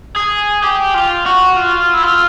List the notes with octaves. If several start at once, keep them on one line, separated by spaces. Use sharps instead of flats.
G#4
G4
F4
F#4
F4
E4
F4